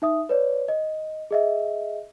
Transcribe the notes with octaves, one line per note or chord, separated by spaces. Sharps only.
D#4 E5 D#6
B4 C#5 D5
D#5
G#4 D#5 E5